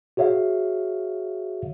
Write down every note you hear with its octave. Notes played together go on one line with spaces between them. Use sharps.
F#4 G#4 C#5 E5 F5